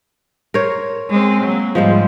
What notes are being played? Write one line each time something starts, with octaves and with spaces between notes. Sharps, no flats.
A#4 C5 C#5
G#3 C4
F#3 A#3
G#2 F3 G3 G#3 C5